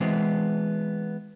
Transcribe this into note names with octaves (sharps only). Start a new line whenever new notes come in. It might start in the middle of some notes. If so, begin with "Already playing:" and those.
E3 G#3 B3 C4